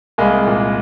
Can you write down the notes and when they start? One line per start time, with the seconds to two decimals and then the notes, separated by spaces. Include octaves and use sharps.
0.18 C2 G#3 A#3
0.47 A#2